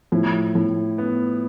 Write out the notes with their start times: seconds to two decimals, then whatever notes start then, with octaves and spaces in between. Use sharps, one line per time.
0.12 A2 F3
0.55 A2
0.98 B3